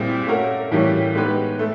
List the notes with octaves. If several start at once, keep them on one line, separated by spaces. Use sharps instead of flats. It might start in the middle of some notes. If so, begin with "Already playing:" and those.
Already playing: A#2 G3 C4 E4 G#4
A3 C#4 F#4 A#4
A2 E3 G3 A#3 C#4
G#3 B3 D#4 G4 B4
A3